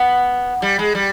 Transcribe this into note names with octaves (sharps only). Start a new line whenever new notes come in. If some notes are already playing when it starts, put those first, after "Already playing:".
Already playing: B3
G3
G#3
G3